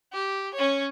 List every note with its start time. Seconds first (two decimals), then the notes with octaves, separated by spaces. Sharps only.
0.13 G4
0.54 C#4 C#5